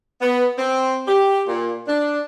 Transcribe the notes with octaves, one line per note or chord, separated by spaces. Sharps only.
B3
C4
G4
A#2
D4